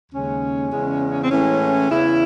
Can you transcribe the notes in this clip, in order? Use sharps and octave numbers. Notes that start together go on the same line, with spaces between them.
D#2 C#3 G#3 C#4
E2 C#3 G#3
C4
A2 E3 G#3 C#4
E2 C#3 E3 E4